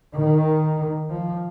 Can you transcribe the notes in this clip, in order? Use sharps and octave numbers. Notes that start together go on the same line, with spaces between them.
D#3
F3